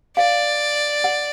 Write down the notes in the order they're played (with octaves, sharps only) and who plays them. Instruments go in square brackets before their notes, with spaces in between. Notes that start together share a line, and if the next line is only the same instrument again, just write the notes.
[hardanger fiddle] D5 [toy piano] F5
[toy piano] F#5